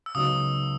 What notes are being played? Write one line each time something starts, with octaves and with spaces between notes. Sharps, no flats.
E6
C#2 C#3 F#3 B3 D#4 D#6